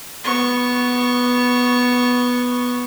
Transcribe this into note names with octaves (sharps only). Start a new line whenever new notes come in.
B3 C#6